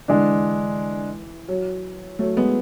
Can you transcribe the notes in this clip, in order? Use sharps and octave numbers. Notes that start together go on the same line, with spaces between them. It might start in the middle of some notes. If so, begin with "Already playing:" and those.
D3 E3 G#3 D4
F#3
F#3 A3
G#3 B3